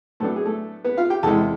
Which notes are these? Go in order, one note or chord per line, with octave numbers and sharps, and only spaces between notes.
A2 F#3 A3 B3 D4 A4
G#4
A3 A4
B3 B4
F4 F5
G4 G5
E2 C3 E3 G#3 A4 A5